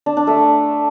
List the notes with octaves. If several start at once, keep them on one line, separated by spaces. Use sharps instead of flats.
D4
D4
A3